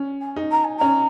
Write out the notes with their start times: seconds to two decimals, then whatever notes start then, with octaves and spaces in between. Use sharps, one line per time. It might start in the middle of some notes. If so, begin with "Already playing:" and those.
Already playing: C#4
0.21 G#5
0.36 D#4
0.51 A#5
0.64 G#5
0.77 C#4 A#5